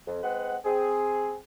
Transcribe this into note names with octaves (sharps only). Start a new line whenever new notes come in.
F2
G#3 C4 B4 F#5
C4 G#4